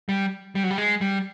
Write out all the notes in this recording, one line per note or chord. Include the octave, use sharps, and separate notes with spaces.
G3
G3
F#3
G3
G#3
G3